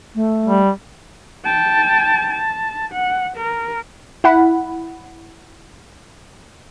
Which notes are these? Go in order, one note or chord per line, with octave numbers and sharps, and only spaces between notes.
A3
G3
G5 A5
A5
F#5
A#4
E4 F#5 B5